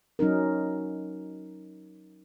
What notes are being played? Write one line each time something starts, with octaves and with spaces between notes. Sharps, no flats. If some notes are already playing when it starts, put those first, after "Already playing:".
F#3 C#4 D#4 A#4